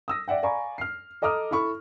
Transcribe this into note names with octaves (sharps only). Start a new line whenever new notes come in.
D#6 E6 A#6
D5 E5 F#5 G5
D5 F5 G#5 A#5 B5 C#6
F6 C7
A4 D#5 A#5 D6 D#6 F6
E4 A4 B5 C#6